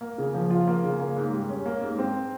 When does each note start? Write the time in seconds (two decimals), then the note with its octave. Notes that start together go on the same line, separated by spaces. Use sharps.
0.01 A#3
0.18 C#3
0.34 F3
0.51 F4
0.68 A#3
0.84 C#3
1.00 A#3
1.17 G#2
1.33 G3
1.49 C#4
1.66 A#3
1.81 G#2
1.99 C4